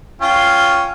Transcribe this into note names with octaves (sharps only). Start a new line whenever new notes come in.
C#4 F4 G5